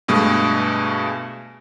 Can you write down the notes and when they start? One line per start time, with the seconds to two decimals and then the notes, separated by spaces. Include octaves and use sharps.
0.08 G2 B2 G#3 A3